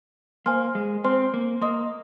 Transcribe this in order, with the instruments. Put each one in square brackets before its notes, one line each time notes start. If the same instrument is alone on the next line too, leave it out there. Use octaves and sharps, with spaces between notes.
[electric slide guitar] A#3 [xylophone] C5 G#5 C6 F6
[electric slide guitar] G#3
[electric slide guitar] C4 [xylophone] C5 G#5 C6 F6
[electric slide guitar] A#3
[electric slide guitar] A#3 [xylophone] D#5 C6 D#6